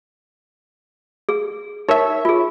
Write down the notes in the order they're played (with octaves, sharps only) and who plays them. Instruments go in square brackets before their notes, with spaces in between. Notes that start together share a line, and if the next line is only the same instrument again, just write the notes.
[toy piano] G#4
[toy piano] D#4 A#4 [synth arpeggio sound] C#5 E5
[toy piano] F4 G#4